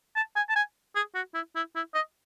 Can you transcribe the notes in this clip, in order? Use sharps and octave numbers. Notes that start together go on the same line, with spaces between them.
A5
G#5
A5
G#5
G#4
F#4
E4
E4
E4
D#5